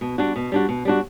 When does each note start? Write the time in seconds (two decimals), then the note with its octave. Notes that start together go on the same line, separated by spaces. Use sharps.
0.01 B2
0.18 G3 D4 F#4
0.36 B2
0.52 G3 D4 F#4
0.69 B2
0.85 G3 D4 F#4